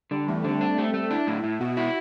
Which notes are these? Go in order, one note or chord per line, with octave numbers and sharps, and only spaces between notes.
D3 G3
E2 A3
D3 C4
D4
A3
A3
D4 E4
A2
A2
B2 F#4
E4 F#4